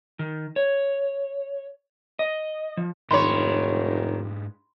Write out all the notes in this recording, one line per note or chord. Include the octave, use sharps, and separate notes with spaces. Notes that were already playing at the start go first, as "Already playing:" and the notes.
D#3
C#5
D#5
F3
F1 G#2 D#3 D4 C#5 B5 C6